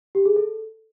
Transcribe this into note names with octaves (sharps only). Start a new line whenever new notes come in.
G4
G#4
A4